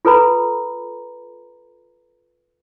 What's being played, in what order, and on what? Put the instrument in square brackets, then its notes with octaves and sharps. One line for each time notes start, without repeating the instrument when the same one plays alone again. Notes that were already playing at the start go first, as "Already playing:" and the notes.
[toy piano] F4 A4 B4 A#5 B5